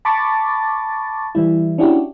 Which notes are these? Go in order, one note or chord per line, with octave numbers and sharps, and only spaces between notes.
A5 B5 C#6 D6 A6
E3 G3 E4
C#4 D4 E4 F#4 G4